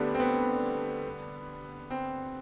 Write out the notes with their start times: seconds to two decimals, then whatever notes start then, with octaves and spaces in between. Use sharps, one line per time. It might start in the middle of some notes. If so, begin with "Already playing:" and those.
Already playing: D3 G3 A3 B3 D4 G4
0.14 C4
0.19 B3
1.90 C4